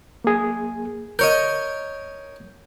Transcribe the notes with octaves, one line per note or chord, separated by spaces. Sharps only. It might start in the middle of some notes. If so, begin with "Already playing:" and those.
A#3 G#4
A#4 C#5 D#5 G6